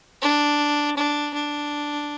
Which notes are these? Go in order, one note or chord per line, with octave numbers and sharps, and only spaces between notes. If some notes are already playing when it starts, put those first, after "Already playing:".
D4
D4
D4